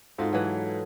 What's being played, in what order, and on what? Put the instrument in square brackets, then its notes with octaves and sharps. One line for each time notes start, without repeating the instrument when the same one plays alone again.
[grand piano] G#2 [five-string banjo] C4 F4 F#4 [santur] A4
[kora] E3 F#3 [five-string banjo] F4 B4